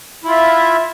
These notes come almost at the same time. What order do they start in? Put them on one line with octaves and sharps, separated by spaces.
E4 F4 E5